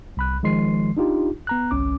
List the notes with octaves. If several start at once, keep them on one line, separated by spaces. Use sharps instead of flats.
C2 B5 F#6
D#3 F3 G#3 C6 C7
D4 D#4 F4 G4
B3 A#5 F#6
G1 C2 C#4 D6